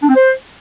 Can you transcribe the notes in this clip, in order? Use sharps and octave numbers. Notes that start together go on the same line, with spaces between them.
D4
C4
C5